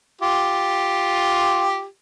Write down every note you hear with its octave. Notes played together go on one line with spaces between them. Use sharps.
F4 G4